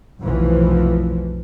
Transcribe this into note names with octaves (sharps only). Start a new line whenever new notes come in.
F1 B1 E3 F3